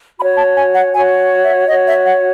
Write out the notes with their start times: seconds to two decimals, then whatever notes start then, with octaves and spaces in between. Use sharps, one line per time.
0.18 F#4 C#5 B5
0.37 A5
0.56 G#5
0.75 F#5
0.93 F#4 C#5 G#5
1.43 E5
1.68 F#4 C#5 D#5
1.88 E5
2.06 F#5